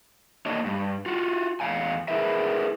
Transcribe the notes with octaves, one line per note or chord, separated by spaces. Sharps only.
A#3 D4 F#4 C#5 D#5
G2
F4 F#4
E2 G2 F5 G#5
E4 G#4 A#4 B4 E5